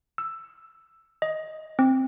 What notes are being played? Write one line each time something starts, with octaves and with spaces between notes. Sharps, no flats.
E6
D#5
C4